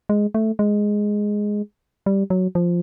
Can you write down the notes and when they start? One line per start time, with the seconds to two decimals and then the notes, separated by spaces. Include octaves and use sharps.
0.09 G#3
0.34 A3
0.59 G#3
2.06 G3
2.30 F#3
2.55 F3